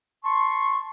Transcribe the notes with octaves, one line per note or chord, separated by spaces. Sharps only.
A5 C6 C#6